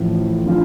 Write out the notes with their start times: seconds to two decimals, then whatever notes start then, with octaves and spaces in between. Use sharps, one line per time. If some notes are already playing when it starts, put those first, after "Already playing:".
Already playing: A1 A2 F3 A3
0.45 D3 F3 C#4 F4